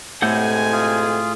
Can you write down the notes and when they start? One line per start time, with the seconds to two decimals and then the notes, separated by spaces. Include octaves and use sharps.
0.22 A2 C3 G#3 A4 F#5 G#5 G6
0.73 F4 G#4